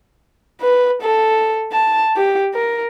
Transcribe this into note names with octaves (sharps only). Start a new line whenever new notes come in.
B4
A4
A5
G4
A#4